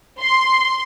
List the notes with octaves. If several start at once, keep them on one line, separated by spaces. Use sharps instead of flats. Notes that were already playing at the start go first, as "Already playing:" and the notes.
C6